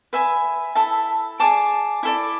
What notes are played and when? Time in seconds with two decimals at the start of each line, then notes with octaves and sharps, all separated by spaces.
0.13 B4 E5 G#5 B5
0.75 E4 A4 E5 A5
1.40 G#4 D5 A5 D6
2.03 E4 A4 D5